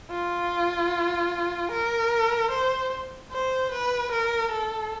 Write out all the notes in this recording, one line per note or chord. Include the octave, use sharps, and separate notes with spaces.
F4
A#4
C5
C5
B4
A#4
A4